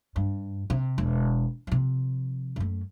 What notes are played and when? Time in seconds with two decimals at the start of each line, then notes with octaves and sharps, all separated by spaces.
0.16 G2
0.70 C3
0.98 E1
1.67 C3 F3
2.56 F#2 A3